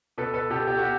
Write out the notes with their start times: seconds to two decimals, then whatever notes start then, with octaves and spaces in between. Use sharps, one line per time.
0.18 B2 A4 B4
0.34 A4 B4
0.50 B2 G4 A4
0.67 G4 A4
0.78 F#4
0.83 G4